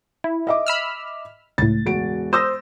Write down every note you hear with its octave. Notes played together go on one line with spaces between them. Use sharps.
E4
D#5 E5 D6
B5 E6 F6
C#2 A2 A6
E1 F#4 D7
C5 D#6 E6 A#6